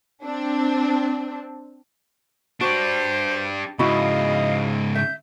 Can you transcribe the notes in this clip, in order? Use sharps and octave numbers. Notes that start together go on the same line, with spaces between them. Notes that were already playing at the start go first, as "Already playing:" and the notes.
C4 D4
D4 F#4 G4 C5
G#2 C#3 E4 F#4 D#5 F5 B5
E5 G6